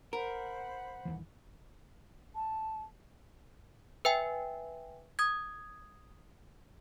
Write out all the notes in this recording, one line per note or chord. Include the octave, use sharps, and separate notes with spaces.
A#4 C5 F#5 B5
D#1 D#2 E3
A5
B4 E5 G5 G#5
D#6 G#6